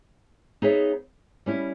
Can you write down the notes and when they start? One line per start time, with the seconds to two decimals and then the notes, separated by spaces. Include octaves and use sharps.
0.62 B3 D#4 G#4 C#5 E5
1.46 G3 C#4 E4